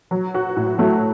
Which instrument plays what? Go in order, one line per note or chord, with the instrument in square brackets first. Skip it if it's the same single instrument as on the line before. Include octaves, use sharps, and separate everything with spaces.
[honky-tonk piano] F#3
F#4
A2
[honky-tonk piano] F#3 [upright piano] A3